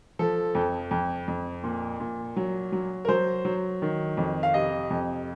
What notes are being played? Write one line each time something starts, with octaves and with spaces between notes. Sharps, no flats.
F3 A4
F2
F2
F2
A#2
A#2
F#3
F#3
A#4
F#3 C5
F#3
D#3
F2
F5
C3 D#5
F2